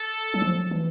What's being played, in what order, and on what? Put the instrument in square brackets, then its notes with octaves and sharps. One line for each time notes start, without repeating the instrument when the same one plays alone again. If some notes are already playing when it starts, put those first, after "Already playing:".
Already playing: [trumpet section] A4
[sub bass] F#3
F3
E3